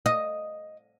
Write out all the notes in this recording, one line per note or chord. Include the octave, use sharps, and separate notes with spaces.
D#5